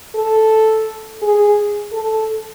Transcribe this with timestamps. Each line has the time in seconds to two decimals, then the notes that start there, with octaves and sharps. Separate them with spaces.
0.15 A4
1.22 G#4
1.92 A4